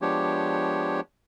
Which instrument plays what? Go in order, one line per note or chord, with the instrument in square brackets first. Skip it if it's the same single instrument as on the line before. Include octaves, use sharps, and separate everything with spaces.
[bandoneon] F3 G#3 B3 D4 G4 C#5